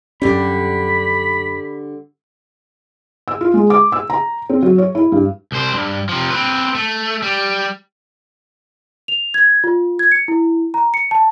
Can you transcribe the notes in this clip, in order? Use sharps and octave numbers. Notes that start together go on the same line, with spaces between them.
F#2 D3 G3 C#4 B5
E6
F4
G#3
D6
E6
A#5
C4
F#3
C#5
E4
G2
C2 C5
G2
C3 F3
C4 B4
A3
G3
F7
G#6
F4
G#6
C#7
E4
A#5
C#7
A5